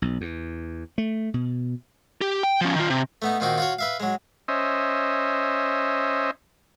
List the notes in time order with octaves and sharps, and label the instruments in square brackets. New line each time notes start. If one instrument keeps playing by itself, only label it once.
[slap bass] B1
E2
A3
B2
[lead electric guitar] G4
G5
F3 C#4
D#3 F4
C3
[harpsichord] A3 B3 D#4
A#2 D#3 C4 D#4 F#4
F4 F#4 C#5
B4 E5 F5
F#3 G#3
[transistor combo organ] C#4 C5 D#5 E5